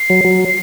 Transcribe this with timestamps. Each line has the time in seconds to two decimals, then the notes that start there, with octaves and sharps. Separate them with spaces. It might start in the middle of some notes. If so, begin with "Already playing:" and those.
Already playing: C7
0.10 F#3
0.25 F#3